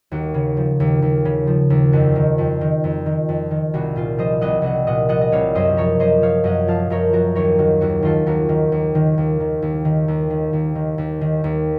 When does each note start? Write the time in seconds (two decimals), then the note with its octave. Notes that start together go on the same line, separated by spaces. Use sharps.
0.11 D#2 F#4
0.34 C#3
0.57 F3
0.80 D#2
1.02 D#2
1.25 C#3
1.47 F3
1.70 D#2
1.93 F2 F#4
2.16 D#3
2.38 F2
2.61 D#3
2.84 F2
3.06 D#3
3.29 F2
3.51 D#3
3.74 C2 F#4
3.96 A#2 F4
4.18 F3 C5 D#5
4.41 C2 D#5 F#5
4.62 C2 D#5 F#5
4.87 A#2 D#5 F#5
5.09 F3 D#5 F#5
5.21 D#5
5.32 C2 C#5 F5
5.55 F#2 C5 D#5
5.77 F3 A#4 C#5
6.00 F#2 C5 D#5
6.22 F3 C#5 F5
6.44 F#2 D#5 F#5
6.68 F3 F5 A5
6.90 F#2 A#4 C#5
7.13 F3 F#4 A#4
7.35 D#2 A#4 C#5
7.59 D#3 F#4
7.81 D#2 F#4
8.02 D#3 F4 A4
8.26 D#2 F#4 A#4
8.49 D#3
8.72 D#2
8.95 D#3
9.18 D#2
9.40 D#3
9.62 D#2
9.85 D#3
10.08 D#2
10.30 D#3
10.53 D#2
10.75 D#3
10.98 D#2
11.21 D#3
11.44 D#2